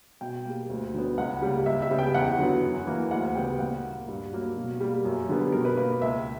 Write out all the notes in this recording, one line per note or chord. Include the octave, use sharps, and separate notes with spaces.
B2 G5
G3 A#3
D2
D3 F#3 B3
C#2 F#5
C#3 G3 A#3
C#2 E5
E5
C#3 G3 B3
G5
E2 F#5
D3 F#3 B3
F#2
E3 A#3
D2 F#5
C#3 G3 B3 G5
A#2 F#5
A#3
G2
F#3 A#3
B2
G3 A#3
F#2
D3 G3 B3
B2 A#4
B4
A#3 B4
C#2 E5